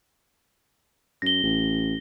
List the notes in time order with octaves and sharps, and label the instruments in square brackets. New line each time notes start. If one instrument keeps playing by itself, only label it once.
[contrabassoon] F#2 [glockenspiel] A#6 G7
[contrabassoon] A1